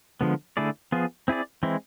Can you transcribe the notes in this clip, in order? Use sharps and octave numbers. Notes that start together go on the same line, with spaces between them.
D3 F3 G#3 B3
D3 A3 E4 G#4 D5
F3 B3 F4 G#4
C4 E4 G#4 D5
E3 G#3 C4 E4